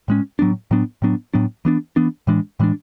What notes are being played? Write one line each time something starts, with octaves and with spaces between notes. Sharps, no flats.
A2 G#3 C#4
A2 F#3 B3 D4
A2 F#3 B3 D4
A2 F#3 B3 D4
A2 F#3 B3 D4
E3 B3 D4
E3 B3 D4
A2 E3 G#3 D4
A2 E3 G#3 D4